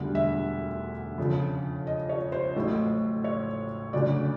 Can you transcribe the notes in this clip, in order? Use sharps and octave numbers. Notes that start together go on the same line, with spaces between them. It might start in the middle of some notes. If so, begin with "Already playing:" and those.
Already playing: E1 D2 D3 G3
E5
F2 C#3 F3
D#5
C#5
C5
A1 A2 F#3
C#5
D2 C#3 F#3 D5